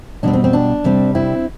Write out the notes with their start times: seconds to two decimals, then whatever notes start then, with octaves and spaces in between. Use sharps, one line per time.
0.23 B2 G3 C4 D4
0.33 C4
0.44 C4
0.53 D4
0.84 C3 G3 C4
1.15 C4 E4